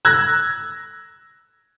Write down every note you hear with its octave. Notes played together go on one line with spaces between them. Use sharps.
E6 F#6 G#6 A#6